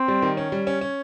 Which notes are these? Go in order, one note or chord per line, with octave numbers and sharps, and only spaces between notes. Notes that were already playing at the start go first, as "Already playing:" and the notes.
Already playing: C4
G3
D#3
C#4
G3
C#4
C#4